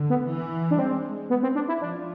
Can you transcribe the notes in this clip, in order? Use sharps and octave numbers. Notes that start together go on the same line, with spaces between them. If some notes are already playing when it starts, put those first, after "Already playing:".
Already playing: D3
B3
E3
D4
G#3 C4
B3
C4
D4
E4
F3 D4